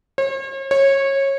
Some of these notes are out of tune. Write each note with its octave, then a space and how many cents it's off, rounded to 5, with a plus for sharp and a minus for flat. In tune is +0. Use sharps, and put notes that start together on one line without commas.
C#5 -45
C#5 -20